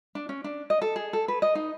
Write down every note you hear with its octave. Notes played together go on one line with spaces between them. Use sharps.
D4
C#4
D4
D#5
A4
G#4
A4
B4
D#5
D#4